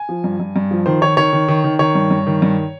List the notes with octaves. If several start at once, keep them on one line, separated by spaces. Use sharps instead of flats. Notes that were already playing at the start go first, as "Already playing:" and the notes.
Already playing: G#5
F3
G2
G2
G2
F3
D#3 C5
D#3 C#5
D#3 C#5
D#3
D#3
D#3
D#3 C#5
G2
G2
D#3
G2